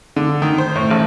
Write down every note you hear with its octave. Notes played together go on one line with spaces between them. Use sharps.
D3
D#3
C5
A2
A1